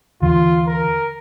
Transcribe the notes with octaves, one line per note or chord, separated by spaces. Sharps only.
D#2 D3 E3 F4
A#4